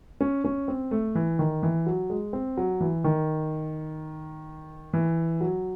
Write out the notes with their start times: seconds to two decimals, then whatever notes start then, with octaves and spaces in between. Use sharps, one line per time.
0.21 C#4
0.44 C#4
0.68 C4
0.91 A3
1.15 E3
1.39 D#3
1.63 E3
1.86 F#3
2.10 G#3
2.33 C4
2.57 F#3
2.80 E3
3.04 D#3
4.93 E3
5.41 F#3